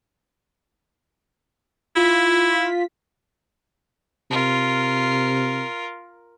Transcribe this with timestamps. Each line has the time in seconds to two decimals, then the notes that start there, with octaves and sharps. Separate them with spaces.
1.96 E4 F4 B6
4.31 C3 F4 A#4